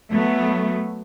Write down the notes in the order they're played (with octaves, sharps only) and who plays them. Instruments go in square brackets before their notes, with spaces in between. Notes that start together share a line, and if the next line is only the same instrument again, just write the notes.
[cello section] F#3 A3 B3